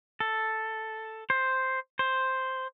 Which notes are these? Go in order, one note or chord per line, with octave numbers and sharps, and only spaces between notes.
A4
C5
C5